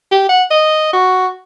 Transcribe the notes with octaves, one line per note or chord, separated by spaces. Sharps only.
G4
F#5
D#5
F#4